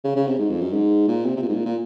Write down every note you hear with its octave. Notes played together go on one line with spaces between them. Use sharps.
C#3
C#3
C3
G#2
F2
F#2
G#2
A#2
C3
C3
A#2
G#2
A#2
A#2